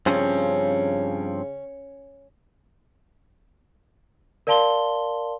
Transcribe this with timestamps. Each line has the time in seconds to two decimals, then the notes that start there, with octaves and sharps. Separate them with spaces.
0.06 G2 C#3 F3 C4 C#4
4.47 A#4 D5 F5 A5 C6 G7